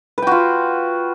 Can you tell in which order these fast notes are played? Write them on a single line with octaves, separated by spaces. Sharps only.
B4 G5 F#4 F4